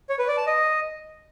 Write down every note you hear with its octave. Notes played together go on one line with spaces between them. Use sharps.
C#5
B4
D5
A5
D#5